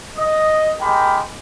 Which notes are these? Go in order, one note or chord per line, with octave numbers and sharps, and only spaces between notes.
D#5
G#3 G4 A#4 G5 B5